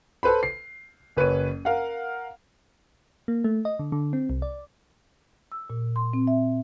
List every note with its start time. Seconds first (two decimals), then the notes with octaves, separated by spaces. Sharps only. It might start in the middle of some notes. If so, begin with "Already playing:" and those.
0.23 A4 B4 C5 B5
0.43 C7
1.17 F#1 B4 C#5 D#7
1.65 A#4 F5 F#5
3.28 A#3
3.44 A3
3.65 D#5
3.79 D3
3.92 D3
4.13 C4
4.30 C2
4.42 D5
5.52 E6
5.70 A#2
5.96 C6
6.13 C4
6.27 E5